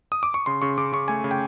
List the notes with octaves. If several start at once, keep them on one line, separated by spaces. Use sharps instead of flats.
D#6
D6
C#6
C#3 C6
C#3 C#6
C#3 D6
C#3 C#6
A3 G#5
C#3
G5